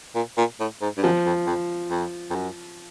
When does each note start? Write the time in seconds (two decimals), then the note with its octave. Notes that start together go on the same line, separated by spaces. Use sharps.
0.15 A#2
0.37 A#2
0.60 A2
0.81 G#2
0.97 G2
1.03 F#2 F3
1.26 F2
1.47 F2
1.91 F2
2.30 F2
2.35 F#2